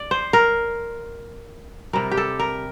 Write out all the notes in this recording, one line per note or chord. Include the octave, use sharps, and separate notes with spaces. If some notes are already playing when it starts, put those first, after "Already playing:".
Already playing: D5
C5
A#4
C3 G3 A#4
G4
A4
A#4